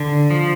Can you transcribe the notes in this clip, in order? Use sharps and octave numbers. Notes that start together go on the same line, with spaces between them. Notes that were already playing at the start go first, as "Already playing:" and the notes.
Already playing: D3
F3